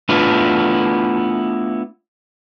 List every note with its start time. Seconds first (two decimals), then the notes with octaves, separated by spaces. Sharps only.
0.09 A3 B3 D4 E4 F4 B4